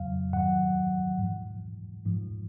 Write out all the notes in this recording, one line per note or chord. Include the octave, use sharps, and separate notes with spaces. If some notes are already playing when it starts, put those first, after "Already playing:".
Already playing: F2 C#3 F#3 F5
G#2 D#3 F#3 F#5
G#2 F3
G#2 F3